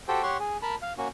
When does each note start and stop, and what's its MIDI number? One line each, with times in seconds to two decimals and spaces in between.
0.08 0.22 66
0.08 0.22 67
0.08 0.22 69
0.08 0.22 72
0.08 0.22 79
0.23 0.37 67
0.23 0.37 73
0.23 0.37 78
0.23 0.37 84
0.23 0.37 85
0.40 0.57 68
0.62 0.75 70
0.62 0.75 81
0.62 0.75 83
0.82 0.93 77
0.98 1.08 58
0.98 1.08 61
0.98 1.08 66